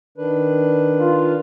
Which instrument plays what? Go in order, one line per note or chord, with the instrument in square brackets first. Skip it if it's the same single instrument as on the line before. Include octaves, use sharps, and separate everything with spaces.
[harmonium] D#3 D4 B4
[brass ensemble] F4